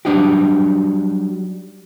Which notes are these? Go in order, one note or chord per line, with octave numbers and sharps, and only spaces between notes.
F#3 G3 D4 D#4 F#4 G4